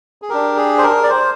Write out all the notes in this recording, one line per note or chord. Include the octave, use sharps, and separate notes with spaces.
G#4
D4 G4 A#4
G#4
C5
A#4
D5
C5